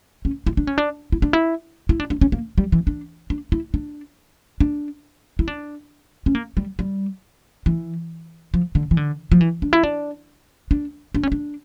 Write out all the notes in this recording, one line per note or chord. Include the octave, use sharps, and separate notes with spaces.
C#4
E4
D4
C#4
D4
E4
D4
E4
E4
D4
D4
C#4
A#3
G3
E3
D4
D4
E4
D4
D4
E4
D4
C#4
A#3
G3
G3
E3
F3
D3
E3
D3
F3
E3
D4
E4
D4
D4
D4
C#4
D4